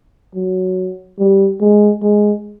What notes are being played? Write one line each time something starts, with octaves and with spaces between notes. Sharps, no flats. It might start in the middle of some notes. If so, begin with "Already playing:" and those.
F#3
G3
G#3
G#3